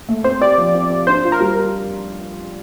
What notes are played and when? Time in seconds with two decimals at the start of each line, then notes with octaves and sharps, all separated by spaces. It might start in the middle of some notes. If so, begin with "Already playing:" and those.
0.09 A3
0.24 C4 C5
0.41 G4 D5
0.58 F3
0.74 C4
0.90 G4
1.07 D4 C5
1.24 F4
1.32 A#4
1.40 G3